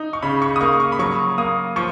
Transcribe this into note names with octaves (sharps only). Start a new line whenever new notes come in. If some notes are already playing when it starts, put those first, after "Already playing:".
Already playing: D#4
C#6
C#3 B5
C#6
D#6
A#3 C#6
C#6
B5
F#3 C#6
A#3 D#6
F3 C#6